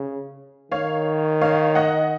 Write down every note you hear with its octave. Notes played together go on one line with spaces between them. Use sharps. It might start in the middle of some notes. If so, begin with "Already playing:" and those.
Already playing: C#3
D#3 C#5 F5
C#5 F5
D#5 F#5